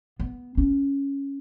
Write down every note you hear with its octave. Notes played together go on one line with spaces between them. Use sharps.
B3
C#4